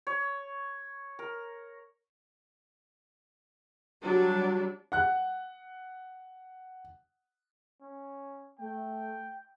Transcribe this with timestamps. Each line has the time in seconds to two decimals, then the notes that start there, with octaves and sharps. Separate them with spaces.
0.07 C#5
1.19 A#4
4.02 F#3 G3 D4
4.92 F#5 F#6
7.82 C#4
8.59 A3 G5